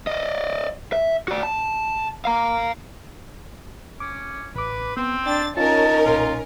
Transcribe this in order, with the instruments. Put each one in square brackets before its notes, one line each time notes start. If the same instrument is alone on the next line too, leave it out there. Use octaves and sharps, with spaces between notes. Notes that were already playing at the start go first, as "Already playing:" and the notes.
[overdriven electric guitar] D5 D#5
E5
F#4 D5
A5
F5 A#5
[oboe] C#4 [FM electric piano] D6
[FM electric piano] A1 D6 [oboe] B4
[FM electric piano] B3 [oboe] C4
[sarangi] D4 [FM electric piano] G5 C6 [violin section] A6
[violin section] C#4 A#4 [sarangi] D#4 [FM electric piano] F4 [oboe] A5
[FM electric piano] B1 A#2 [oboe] F4